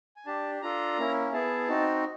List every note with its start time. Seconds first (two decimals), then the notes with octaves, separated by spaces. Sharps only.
0.16 G#5
0.26 D4 G4 A5
0.62 D4 F4 A4 A#5
0.98 A#3 C#4 E4
1.33 B3 E4 G#4 A5
1.69 C4 D#4 F#4